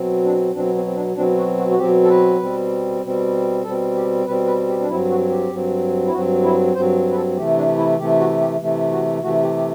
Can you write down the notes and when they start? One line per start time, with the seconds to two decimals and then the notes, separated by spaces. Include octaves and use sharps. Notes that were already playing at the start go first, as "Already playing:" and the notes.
Already playing: B2 F#3 C4
0.24 D4
0.54 B2 F#3 C4 D4
0.75 C4
0.86 C4
0.96 D4
1.16 B2 F#3 C4 D4
1.38 F#4
1.57 F#4
1.71 F#4
1.79 B2 F#3 C4 G4
2.03 A4
2.09 B4
2.40 B2 G3 C4
3.02 B2 G3 C4
3.64 B2 G3 C4 A4
3.95 G4
4.26 B2 G3 C4 B4
4.47 B4
4.68 G4
4.80 D4
4.89 G2 F#3 C4 E4
5.10 F#4
5.30 G4
5.50 G2 F#3 C4
6.07 E4
6.12 G2 F#3 C4 F#4
6.44 E4
6.75 G2 F#3 C4 C5
7.11 B4
7.16 A4
7.36 C3 E3 A3 G4
7.57 D4
7.78 E4
7.99 C3 E3 A3 G4
8.19 F#4
8.41 G4
8.60 C3 E3 A3
8.91 F#4
9.23 C3 E3 A3 F#4
9.43 G4
9.57 G4